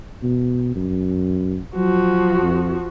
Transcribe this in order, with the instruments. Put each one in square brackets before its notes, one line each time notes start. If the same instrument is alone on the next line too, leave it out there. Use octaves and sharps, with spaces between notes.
[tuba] B2
F#2
[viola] F3 F#4 [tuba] F#3
[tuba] F2